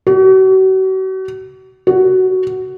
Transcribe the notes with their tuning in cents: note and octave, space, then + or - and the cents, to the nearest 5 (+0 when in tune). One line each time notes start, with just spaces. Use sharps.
F#4 +40
F#4 +10